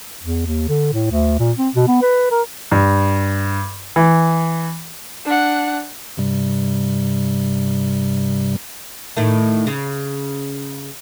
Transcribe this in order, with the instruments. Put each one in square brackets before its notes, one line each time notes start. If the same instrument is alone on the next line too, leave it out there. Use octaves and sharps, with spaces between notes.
[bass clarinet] E2
D#2
D3
A2
D2
A#2
C4
B2
B3
B4
A#4
[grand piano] G2
E3
[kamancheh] D4 F#5
[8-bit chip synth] G2 C3 G3
[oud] A2 D#3 A3
C#3